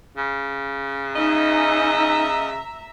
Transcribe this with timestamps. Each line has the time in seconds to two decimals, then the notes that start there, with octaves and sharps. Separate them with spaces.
0.17 C#3
1.16 D#4 D#5 E5 G#5 A#5